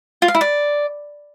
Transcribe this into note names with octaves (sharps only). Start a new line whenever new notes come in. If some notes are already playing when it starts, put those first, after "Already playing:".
F4
F5
E4
D5